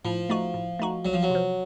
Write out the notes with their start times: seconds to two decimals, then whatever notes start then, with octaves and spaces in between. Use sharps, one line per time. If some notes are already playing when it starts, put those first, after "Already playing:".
0.05 A2 F3
0.29 A3 D#4 F#4
0.54 A2
0.79 A3 D#4 F#4
1.05 C2 F#3
1.13 F3
1.23 F#3
1.30 C3
1.35 F3